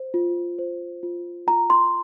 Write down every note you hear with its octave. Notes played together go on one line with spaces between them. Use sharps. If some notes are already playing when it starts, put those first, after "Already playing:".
Already playing: C5
F4
C5
F4
F4 A#5
C6